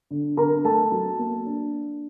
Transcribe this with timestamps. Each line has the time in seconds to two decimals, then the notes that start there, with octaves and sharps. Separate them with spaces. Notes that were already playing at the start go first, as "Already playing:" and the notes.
0.11 D3
0.37 D3 A#4 A#5
0.64 A3 A4 A5
0.92 F#3
1.19 A#3
1.45 D4